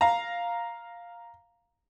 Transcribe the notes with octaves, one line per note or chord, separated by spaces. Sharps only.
F5 A#5